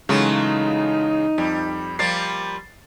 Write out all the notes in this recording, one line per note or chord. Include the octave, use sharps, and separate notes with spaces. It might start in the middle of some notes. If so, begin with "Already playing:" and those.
C#3 E3 F#3 G#3 A3 D#4 F4
F2 G3
F3 G3 A#3 A6 C7